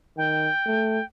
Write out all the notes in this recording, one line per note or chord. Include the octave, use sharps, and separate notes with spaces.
D#3 G5
A3